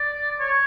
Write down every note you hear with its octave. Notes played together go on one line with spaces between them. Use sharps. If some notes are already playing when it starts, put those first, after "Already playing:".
Already playing: D5
C#5